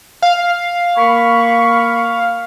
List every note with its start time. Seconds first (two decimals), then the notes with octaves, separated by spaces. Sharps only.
0.22 F5
0.97 A#3 B5 C#6